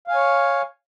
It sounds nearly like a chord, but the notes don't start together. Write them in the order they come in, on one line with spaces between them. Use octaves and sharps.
F5 G#5 C#5